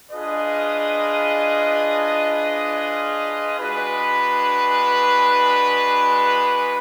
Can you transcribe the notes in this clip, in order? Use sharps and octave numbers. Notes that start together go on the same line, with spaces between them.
D4 F4 G#4 B4 D#5
G#3 D4 F#4 B4